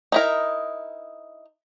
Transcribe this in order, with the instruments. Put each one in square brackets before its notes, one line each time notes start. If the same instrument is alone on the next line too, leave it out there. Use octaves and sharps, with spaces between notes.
[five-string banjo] D#4 E4 A#4